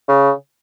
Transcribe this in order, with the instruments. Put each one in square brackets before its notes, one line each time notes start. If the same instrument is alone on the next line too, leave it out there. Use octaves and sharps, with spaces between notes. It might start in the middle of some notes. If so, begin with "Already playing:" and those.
[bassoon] C#3